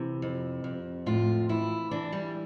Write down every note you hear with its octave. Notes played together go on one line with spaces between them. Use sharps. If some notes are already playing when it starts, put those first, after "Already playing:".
Already playing: C3 E3
F2
F2
A2 F4
E3 E4
E3 D4
G3